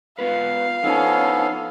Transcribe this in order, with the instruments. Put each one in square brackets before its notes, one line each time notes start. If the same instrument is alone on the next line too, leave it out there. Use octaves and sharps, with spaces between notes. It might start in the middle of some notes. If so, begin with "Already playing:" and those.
[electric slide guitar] B3 F4 B4 [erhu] F5
[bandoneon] F3 B3 A4 [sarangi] C#4 [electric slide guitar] D#4 E4